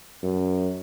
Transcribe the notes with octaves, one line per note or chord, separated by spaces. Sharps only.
F#2